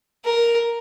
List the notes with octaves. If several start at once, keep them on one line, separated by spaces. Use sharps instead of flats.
A#4